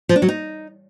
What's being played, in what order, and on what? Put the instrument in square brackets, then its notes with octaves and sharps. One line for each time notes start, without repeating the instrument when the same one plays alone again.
[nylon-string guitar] F3
D4
F#3
D#4